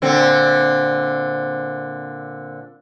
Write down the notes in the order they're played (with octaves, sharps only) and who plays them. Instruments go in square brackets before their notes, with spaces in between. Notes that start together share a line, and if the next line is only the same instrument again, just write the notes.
[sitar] A#2 D3 C4